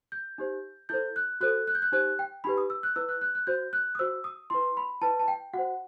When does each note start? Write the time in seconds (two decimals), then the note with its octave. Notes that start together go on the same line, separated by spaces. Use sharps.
0.12 G6
0.38 D#4 G4 C5
0.89 E4 A4 C5 G6
1.16 F#6
1.41 F#4 A4 C5 F#6
1.67 F#6
1.75 G6
1.82 F#6
1.92 D#4 G4 C5 F#6
2.19 G5
2.44 D#4 G4 B4 B5
2.57 D#6
2.70 E6
2.83 F#6
2.96 E4 B4 E6
3.09 F#6
3.21 F#6
3.35 F#6
3.47 F#4 C5 G6
3.73 F#6
3.95 D#6
3.99 F#4 C5 E6
4.24 D#6
4.50 E4 B4 C6
4.77 B5
5.02 E4 B4 A5
5.19 A5
5.28 G5
5.54 F#4 C5 F#5